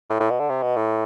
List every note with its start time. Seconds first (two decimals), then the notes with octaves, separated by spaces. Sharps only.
0.10 A2
0.20 A2
0.30 B2
0.40 D3
0.49 C3
0.62 B2
0.76 A2